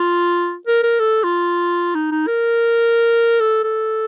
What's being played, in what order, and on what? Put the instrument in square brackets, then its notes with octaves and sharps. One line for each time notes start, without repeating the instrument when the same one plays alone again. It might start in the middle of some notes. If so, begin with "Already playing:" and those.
Already playing: [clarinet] F4
A#4
A#4
A4
F4
D#4
D#4
A#4
A4
A4